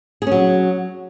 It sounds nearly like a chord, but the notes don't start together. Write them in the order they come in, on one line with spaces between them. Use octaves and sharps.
G#4 C#4 F#3